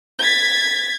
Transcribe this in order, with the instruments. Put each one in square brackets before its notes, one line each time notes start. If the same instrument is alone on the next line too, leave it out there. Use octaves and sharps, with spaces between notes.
[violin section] G#6 A6 B6